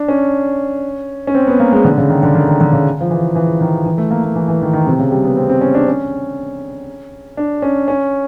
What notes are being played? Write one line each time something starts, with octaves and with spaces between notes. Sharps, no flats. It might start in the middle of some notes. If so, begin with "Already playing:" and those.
Already playing: D4
C#4
C#4
C4
B3
A#3
G#3
D3
C#3
D#3
D3
D#3
D#3
D3
C#3
F3
E3
E3
D#3
E3
A3
A#3
A#3
E3
E3
D#3
D#3
C3
C#3
G3
B3
C4
C4
C#4
D4
C#4
D4
C#4
C#4